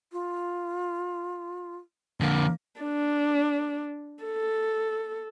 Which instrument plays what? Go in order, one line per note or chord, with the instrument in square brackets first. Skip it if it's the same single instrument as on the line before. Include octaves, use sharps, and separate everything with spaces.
[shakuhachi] F4
[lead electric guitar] F2 D3 [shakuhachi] A#3
[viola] D4
A4